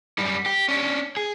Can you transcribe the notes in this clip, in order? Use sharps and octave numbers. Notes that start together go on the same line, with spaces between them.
F#2 G3
G4
C#4 D4
G#4